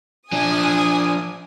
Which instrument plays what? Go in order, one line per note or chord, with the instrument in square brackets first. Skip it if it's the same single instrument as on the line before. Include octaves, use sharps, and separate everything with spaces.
[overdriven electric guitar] F3 D4 [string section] G#5 D#6